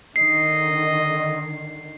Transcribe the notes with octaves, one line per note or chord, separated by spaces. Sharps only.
D3 D#3 D#5 C7